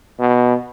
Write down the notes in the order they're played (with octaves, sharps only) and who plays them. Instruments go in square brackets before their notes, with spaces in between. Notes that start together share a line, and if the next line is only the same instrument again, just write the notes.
[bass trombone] B2